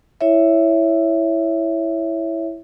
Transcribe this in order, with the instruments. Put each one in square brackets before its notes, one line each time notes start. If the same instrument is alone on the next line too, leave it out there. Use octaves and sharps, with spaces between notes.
[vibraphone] E4 C#5 E5